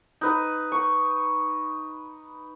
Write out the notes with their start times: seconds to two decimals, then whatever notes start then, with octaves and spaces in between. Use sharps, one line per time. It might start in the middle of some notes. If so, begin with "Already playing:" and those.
0.21 D#4 B4 D#5
0.72 C#6